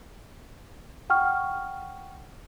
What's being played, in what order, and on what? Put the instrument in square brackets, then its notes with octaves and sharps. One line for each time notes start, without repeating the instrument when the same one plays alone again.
[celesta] F#5 G5 C#6 F6